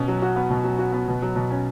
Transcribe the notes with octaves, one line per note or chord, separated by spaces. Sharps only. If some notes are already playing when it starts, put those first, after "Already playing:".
Already playing: B2 C#4
F#3
F#4
B3
B2
F#3
F#4
B3
B2
F#3
B2
C#4